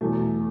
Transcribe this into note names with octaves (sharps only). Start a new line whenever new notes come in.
E2 B2 F#3 A3